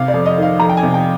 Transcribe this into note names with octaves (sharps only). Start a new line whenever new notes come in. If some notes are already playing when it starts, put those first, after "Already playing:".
Already playing: C3 F5
D5
F2
D#5
D#3 F5
F2 A#5
G5
G#5
C3
G5